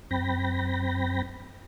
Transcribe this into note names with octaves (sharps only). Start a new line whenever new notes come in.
F#2 C4 G5 B5 A#6